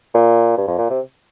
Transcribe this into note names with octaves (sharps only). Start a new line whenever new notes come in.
A#2
G2
F2
A#2
C3